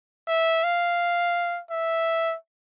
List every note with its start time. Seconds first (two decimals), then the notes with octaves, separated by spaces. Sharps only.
0.28 E5
0.64 F5
1.71 E5